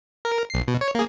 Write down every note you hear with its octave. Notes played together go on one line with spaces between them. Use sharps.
A#4
B1 C7
B2
C#5
A#3 G#4